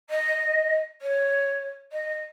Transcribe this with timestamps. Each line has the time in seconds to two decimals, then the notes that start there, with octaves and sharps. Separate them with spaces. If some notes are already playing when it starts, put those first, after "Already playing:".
0.10 D#5
1.01 C#5
1.92 D#5